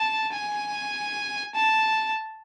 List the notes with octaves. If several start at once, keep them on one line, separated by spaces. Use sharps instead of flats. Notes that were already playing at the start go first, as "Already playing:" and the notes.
Already playing: A5
G#5
A5